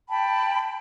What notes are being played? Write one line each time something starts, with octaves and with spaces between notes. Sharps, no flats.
G5 A5 B5